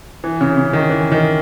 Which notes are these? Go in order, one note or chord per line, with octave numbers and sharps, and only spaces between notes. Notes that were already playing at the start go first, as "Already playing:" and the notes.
E3
C#3
C#3
D#3
E3
D#3